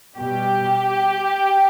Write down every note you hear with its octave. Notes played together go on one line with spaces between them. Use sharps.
B2 G3 G4